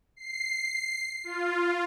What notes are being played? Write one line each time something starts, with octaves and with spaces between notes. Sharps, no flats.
C7
F4